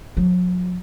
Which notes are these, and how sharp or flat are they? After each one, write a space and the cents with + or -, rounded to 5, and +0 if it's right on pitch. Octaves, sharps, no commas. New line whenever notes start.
F#3 -40